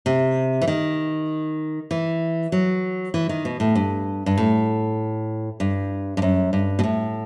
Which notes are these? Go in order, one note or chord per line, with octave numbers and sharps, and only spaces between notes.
C3
E3
D#3
E3
F#3
E3
D#3
B2
A2
G2
G2
A2
G2
G2
F#2
G2
B2
A2